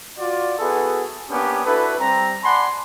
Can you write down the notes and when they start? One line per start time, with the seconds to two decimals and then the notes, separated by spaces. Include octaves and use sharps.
0.19 F4 F#4 D5
0.59 B3 E4 F#4 G#4 A4 B4
1.30 A#3 B3 C#4 D4 G4
1.66 D4 E4 F#4 A4 B4
1.99 G3 C4 A#5
2.43 D5 F#5 G#5 A5 B5 C6